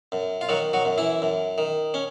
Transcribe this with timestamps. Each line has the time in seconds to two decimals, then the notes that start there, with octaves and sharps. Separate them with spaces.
0.12 F#2
0.41 F4
0.49 D#3 F#3 F#4
0.73 F#3 F#4
0.85 F#2
0.98 E3 E4
1.22 F#2
1.58 D#3
1.94 C#4